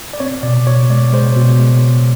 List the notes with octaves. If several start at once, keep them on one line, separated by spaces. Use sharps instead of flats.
D5
C4 C#5
B2 D5
B2 C#5
G#3 D5
G#3 C5
B2
G#3
B2